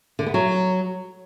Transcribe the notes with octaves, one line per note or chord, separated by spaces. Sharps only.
D3
B3
F#3